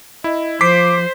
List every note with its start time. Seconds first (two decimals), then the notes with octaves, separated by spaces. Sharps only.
0.24 E4 D#5
0.61 F3 C5 D6 B6 C7